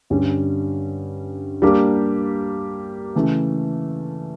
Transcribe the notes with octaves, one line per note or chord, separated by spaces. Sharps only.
G2 D3 G3 C#4 G4
G3 A#3 D4 G4
C#3 E3 A3